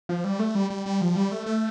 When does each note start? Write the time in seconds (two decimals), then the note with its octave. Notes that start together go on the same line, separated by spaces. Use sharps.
0.09 F3
0.24 G3
0.39 A3
0.55 G3
0.70 G3
0.86 G3
1.01 F3
1.16 G3
1.31 A3
1.46 A3